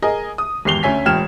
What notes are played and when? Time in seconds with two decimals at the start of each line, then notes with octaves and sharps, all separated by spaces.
0.02 G#4 A#4 D#5 G#5
0.38 D#6
0.65 G#1 E2 G4 C7 F7 G7
0.83 D2 C#4 E5 G#5 B6
1.05 E1 A2 G5 F6 G#6 E7